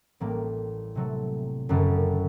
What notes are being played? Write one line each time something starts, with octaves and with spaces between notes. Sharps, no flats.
A1 A2 G3 A#3
C3 F#3 A3
F#1 F#2 D3